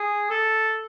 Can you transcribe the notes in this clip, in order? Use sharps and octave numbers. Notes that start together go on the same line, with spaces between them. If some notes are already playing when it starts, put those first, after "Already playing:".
Already playing: G#4
A4